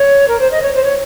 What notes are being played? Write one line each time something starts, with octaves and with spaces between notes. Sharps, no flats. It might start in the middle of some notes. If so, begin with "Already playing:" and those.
Already playing: C#5
A#4
C5
D#5
C#5
C5
C#5